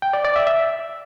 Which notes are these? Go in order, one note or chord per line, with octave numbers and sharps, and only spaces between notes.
G5
D5
D5
E5
E5